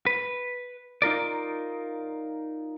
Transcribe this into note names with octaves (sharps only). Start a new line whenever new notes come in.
B4
D#4 F4 A#4 D5